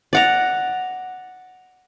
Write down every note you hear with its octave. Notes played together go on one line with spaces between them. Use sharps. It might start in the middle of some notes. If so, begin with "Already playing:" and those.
D5 F#5 A#5